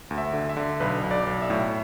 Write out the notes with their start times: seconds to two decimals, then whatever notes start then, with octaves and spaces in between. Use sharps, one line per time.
0.11 D2
0.18 E5
0.33 D3
0.49 E5
0.57 D3
0.80 B1 B4
1.04 B1
1.11 D5
1.27 B1
1.42 E5
1.50 A2